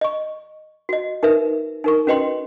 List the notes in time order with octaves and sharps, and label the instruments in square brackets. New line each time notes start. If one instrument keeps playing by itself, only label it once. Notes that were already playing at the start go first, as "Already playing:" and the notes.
[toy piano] D#5 C#6
F#4 D#5
D#4 A#4 B4 E5
D#4 A#4 C#6
C#4 F#4 B4 D#5 G5 C6